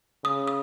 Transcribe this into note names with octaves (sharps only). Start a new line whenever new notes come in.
C#3 D#6
D#6